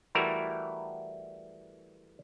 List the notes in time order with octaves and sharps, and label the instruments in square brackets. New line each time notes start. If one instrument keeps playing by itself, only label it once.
[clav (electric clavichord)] E3 G3 A3 E4 F#4 A#4